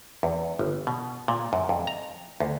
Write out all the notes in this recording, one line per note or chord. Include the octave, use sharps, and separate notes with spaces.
E2
G1
B2
A#2
F#2
F2
A#5
D2